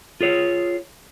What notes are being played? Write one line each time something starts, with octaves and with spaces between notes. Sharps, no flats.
F4 G#4 C#5